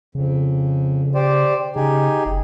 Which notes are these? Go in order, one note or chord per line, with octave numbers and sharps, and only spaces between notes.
F2 C#3
G4 C5 D5
C#3 D#4 G4 G#4
F#1